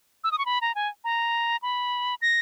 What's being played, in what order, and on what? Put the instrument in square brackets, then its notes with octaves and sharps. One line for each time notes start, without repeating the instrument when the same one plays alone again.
[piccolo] E6
D#6
C#6
B5
A#5
G#5
A#5
B5
A#6